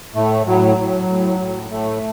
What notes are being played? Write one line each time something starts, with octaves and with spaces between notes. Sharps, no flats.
A2 A3
A2 F#3
A2
A2
A2
A2 A3